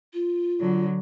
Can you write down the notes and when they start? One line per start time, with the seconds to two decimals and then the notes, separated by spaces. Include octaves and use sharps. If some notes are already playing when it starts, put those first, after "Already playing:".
0.14 F4
0.60 D3 F#3